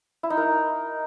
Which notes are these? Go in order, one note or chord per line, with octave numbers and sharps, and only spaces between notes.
E4
D#4
A#4